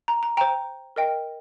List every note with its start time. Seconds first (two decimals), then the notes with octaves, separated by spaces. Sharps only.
0.08 A#5
0.23 A#5
0.37 C5 G5 A#5
0.96 A#4 D#5 G5